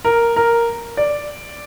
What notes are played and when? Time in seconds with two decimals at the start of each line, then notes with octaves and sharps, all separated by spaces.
0.05 A#4
0.36 A#4
0.97 D5